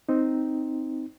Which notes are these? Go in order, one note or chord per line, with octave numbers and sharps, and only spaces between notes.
C4 D#4